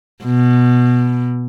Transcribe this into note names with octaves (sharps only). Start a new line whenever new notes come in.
B2